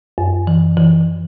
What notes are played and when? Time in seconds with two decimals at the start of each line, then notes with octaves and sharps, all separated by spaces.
0.18 F#2
0.47 E3
0.77 E3